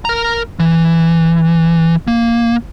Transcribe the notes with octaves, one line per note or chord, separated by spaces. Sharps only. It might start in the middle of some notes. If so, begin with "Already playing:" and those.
A#4 A#5
E3
A#3